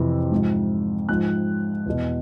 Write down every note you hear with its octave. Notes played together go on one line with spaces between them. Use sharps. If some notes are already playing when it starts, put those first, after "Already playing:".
Already playing: F2 C3 E3
G#2 F3
G#2 F3 F#6
E2 B2